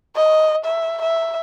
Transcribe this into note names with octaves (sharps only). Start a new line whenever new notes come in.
D#5
E5
E5